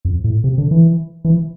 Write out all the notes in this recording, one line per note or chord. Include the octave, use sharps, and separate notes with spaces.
F2
A2
C3
D3
E3
E3